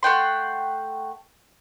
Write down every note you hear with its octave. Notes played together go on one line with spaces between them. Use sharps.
A3 F#5 G5 C6